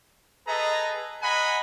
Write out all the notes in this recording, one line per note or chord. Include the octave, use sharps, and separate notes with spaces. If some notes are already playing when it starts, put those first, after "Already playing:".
G#4 A4 B4 D#5 A#5
D#5 F#5 G#5 A#5 B5